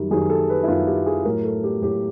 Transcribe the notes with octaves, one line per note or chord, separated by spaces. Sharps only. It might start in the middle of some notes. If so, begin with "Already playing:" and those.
Already playing: F#2 D#3 G3
F#2 D#3 G3 G#4
A4
B4
E4
F#2 D#3 G3 F4
G4
G#4
A2 F#3 A#4
A4
G4
A2 F#3 G4